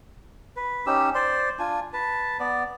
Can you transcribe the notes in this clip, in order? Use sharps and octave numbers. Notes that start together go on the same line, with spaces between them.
B4
C#4 D#4 G4 E6
C5 D5 C6
D4 F4 G#5
B4 A5
B3 D5